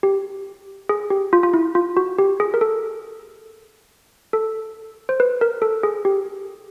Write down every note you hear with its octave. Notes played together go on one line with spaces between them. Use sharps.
G4
G#4
G4
F4
F4
E4
F4
F#4
G4
G#4
A#4
A4
A4
C5
B4
A#4
A4
G#4
G4